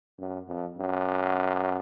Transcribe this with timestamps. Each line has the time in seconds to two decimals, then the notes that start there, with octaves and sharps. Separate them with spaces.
0.20 F#2
0.49 F2
0.78 F#2